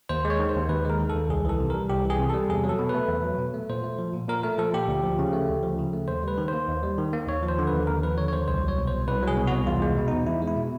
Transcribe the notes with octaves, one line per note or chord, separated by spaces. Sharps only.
D#2 C5
G#3
C#5
D#3
C5
D#2
D#2 B4
G#3 A#4
D#3
A4
D#2
C2 G#4
E3 A4
C3
G3 A#4
C2 G4
E3 G#4
C3
G3 A4
E2 G#4
F#3
A4
B2
B4
A3
E2
F#3
B2
A3
A#2 C5
A3
F3
A#2
A#2 A#4
A3 A#4
F3 A4
A#2 G4
D2
F3
C#3
A3
D2
F3
C#3
A3
D#2 C5
G3 B4
D#3
C5
A#3
D#2
G3
D#3
A#3
D#2 C#5
F3
C5
D3
B4
D#2
D#2 A#4
F3 B4
D3 C#5
C#5
D#2 C5
C2 C5
F#3
C#5
B2
C2 C5
C2 B4
F#3 G#4
B2
C2 F#4
E2 F4
G#3
B2
E2 D#4
E2 E4
G#3
E4
B2